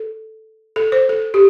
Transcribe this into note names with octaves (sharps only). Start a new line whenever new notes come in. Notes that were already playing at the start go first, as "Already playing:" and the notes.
Already playing: A4
A4
C5
A4
G4